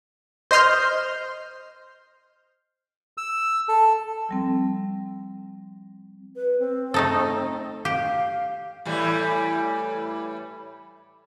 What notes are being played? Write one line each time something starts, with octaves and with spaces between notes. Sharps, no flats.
C5 D#5 C6 F6 G6
E6
A4
F3 G3 C4
B4
C4
A3 D#4 A4
G4 F5
A2 E3 G3